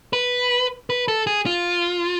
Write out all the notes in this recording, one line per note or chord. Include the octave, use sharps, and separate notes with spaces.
B4
B4
A4
G#4
F4